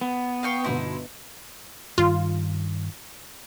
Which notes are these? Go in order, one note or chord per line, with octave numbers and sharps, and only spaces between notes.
B3
F5 G5 C#6
G1 B2 D#4 E4 C6
G2 D#3 F4